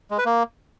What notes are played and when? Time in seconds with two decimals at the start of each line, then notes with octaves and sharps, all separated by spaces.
0.11 G#3
0.18 B4
0.25 A#3